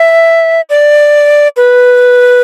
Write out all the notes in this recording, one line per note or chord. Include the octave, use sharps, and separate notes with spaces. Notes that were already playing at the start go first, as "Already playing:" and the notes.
Already playing: E5
D5
B4